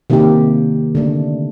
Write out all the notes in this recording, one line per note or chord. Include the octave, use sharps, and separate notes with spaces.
C3 D#3 A#3 D#4 G4
D3 A3 D4